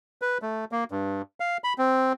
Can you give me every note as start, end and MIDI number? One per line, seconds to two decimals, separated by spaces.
0.22 0.38 71
0.42 0.65 57
0.72 0.84 58
0.91 1.22 43
1.40 1.57 77
1.64 1.73 83
1.78 2.13 60